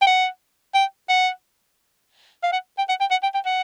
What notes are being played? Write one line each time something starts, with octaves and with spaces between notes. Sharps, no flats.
G5
F#5
G5
F#5
F5
F#5
G5
F#5
G5
F#5
G5
G5
F#5